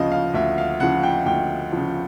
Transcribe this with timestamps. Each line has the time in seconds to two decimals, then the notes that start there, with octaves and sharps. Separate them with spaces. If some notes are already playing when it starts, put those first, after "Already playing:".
Already playing: D2 C#3 F3 D#5 F5
0.12 F5
0.34 D2 E5
0.58 F5
0.80 C#3 F3 F#5
1.03 G5
1.26 D2 G5
1.72 C#3 F3